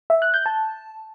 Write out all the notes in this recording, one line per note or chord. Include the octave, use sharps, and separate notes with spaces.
E5
F#6
G6
A5